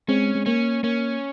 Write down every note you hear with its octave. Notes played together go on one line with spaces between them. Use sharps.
G#3 C4 C#4
G#3
A#3 C#4
A#3 C#4